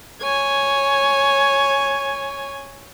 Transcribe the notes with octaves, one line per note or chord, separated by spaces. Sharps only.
C#5 G#5